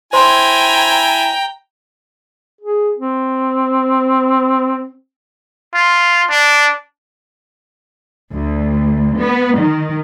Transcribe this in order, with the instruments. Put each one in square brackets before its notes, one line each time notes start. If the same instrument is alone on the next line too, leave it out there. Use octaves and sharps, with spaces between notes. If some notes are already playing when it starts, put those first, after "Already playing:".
[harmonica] E4 G#5 [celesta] C5 C6 [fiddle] G5 A#5
[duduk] G#4
C4
[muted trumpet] F4
D4
[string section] D2
B3
D#3